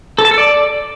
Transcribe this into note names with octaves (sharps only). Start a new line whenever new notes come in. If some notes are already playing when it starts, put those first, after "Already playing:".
A4
A5
A4
D5